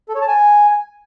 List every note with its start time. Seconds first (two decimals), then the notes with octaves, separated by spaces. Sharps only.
0.09 A4
0.15 C#5
0.22 A5
0.28 G#5